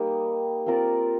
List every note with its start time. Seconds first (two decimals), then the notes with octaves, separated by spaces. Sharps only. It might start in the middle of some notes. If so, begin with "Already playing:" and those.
Already playing: G3 A#3 D#4 G4
0.66 C4 F4 A#4 D5